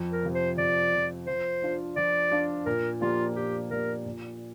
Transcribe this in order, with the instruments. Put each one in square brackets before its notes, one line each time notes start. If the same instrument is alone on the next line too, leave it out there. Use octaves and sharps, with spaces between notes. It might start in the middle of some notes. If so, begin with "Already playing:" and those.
Already playing: [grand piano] F2
[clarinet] A#4
[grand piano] C3 F3
[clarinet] C5
[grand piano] F2 [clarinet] D5
[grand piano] C3 F3
[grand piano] F3 [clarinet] C5
[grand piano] D4 F4
[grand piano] F3 [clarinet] D5
[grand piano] D4 F4
[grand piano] A#2 [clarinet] A#4
[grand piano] F3 A#3 G4 D5 [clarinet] F4
[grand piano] A#2 [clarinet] G4
[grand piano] F3 A#3 G4 D5 [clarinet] A#4
[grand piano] A#2